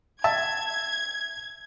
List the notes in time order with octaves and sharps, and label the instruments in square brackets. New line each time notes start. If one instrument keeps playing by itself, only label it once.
[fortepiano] E5 A5 [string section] G#6